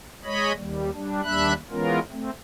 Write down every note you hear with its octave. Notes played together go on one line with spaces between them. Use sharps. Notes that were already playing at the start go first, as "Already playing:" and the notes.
G#3 C#5 D#5 B5
D#2 G3
G3 D4
D#2 G3 D4 E5 B5 F#6
E3 G#3 B3 C#4 F4 A#4
A3 C4